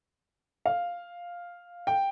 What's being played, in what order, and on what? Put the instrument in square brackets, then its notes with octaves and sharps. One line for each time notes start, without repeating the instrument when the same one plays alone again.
[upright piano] F5
G5